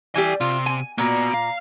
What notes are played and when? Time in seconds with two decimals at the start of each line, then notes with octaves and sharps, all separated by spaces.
0.15 E3 G3 G4 A4 G#5
0.41 C3 F4 C6
0.66 G#5
0.98 A#2 B3 F#4 A#5
1.34 F5